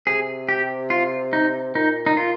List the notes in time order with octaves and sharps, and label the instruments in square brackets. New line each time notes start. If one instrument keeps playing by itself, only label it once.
[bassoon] C3 [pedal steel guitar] G#4
[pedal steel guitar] G4
F4
D#4
[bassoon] A#2 [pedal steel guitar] D#4
[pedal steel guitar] D#4
[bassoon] A#2 [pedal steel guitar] F4